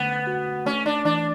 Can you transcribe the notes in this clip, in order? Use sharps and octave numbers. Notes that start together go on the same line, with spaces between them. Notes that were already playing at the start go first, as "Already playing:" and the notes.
Already playing: D3 A3 B3 C#4
F#4
A3 C#4
D4
E3 D4